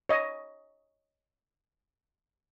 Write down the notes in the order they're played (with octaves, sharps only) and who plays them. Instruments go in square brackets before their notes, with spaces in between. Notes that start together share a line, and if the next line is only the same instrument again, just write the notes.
[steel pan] C#5 D#5